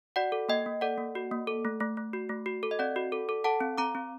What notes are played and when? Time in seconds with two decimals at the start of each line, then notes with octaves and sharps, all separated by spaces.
0.16 F#4 D5 F#5
0.32 A4
0.49 A#3 D#5 G5
0.66 A#3
0.81 A4 D5 F#5
0.98 A#3
1.15 F#4
1.31 A#3
1.47 A4
1.65 A3
1.80 A3
1.97 A3
2.13 F#4
2.29 A3
2.46 F#4
2.63 A4
2.71 D#5
2.79 C4 D5 F#5
2.96 F#4
3.12 A4
3.29 A4
3.44 A4 F#5 A5
3.61 C4
3.78 C4 A#5 D6
3.95 C4